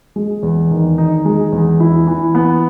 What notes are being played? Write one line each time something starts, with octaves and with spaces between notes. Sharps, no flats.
G#3
E2
D#3
D#4
G#3
E2
E4
E3
B3